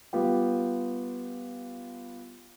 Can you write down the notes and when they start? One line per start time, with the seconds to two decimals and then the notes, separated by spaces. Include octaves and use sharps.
0.13 G3 B3 F4 G4